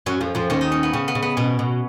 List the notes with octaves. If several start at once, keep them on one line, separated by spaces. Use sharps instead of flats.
F#2 F#3 C#4
F2 F3
F2 F3
D#2 D#3 C#4
D#4
C#4
B3
C#3 C#4
B3
C#3
B3
B2 C#4
B2